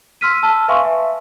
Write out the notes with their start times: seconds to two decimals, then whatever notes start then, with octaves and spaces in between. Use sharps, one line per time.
0.21 C6 E6 F6 B6 D#7
0.43 A5 E6
0.68 B4 E5 F5 G#5 C6 C#6
0.85 E5